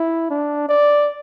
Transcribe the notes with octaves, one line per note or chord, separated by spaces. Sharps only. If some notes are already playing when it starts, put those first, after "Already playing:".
Already playing: E4
D4
D5